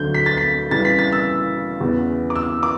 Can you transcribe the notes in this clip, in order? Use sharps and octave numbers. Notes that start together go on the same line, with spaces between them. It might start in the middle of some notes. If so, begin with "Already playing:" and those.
Already playing: D2 D3 F#3 A3 D4 G6
B6
A6
B6
C#3 E3 G3 A6
B6
A6
E6
E2 C#3 E3 B3
D6
E6
D6